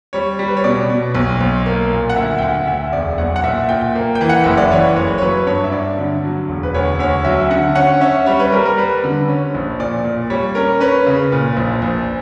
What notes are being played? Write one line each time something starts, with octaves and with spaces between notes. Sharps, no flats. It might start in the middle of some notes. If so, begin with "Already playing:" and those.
G3 C#5
G3
B4
C#5
B2 D5
B2
B1
B1
A#3
A#2
F#5
D2 E5
G5
D2 F#5
D2 E5
E1 D5
B1 F#5
F#5
A#2 E5
A#2 G5
A#3
G5
E3
F#5
F#1 E5
D5
E3 C#5
F#1 C#5
C#5
F#3 B4
G2 C#5
E5
G2 D5
D3
F#3
E1
B4
D2 C#5
D2 C#5
F#3 E5
D3 F#5
C#4 F#5
C#4 E5
G3 C#5
B4
G3 A#4
A#4
G3 B4
D3
C#4
A#1
A#2 D5
A#2
G3 C#5
C#4 A#4
C#4 B4
C#3
A#2
A#1
A#1